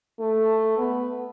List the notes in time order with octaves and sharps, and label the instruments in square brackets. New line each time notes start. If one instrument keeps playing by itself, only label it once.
[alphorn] A3
B3